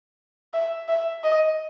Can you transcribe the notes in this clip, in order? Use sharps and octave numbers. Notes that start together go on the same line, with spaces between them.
E5
E5
D#5